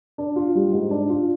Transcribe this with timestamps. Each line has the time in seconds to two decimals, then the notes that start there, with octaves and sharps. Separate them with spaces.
0.18 D4
0.36 F4
0.55 G3
0.73 G#2
0.91 D4
1.09 F4